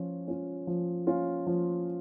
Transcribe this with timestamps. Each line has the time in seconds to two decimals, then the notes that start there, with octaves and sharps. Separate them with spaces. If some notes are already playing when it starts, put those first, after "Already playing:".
Already playing: F3 C#4 F4
0.28 C#4 F4
0.67 F3
1.07 C#4 F4
1.47 F3